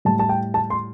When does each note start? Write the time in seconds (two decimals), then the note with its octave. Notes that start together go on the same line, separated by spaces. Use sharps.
0.05 A2 G3 A5
0.19 A5
0.29 G5
0.54 A5
0.70 C6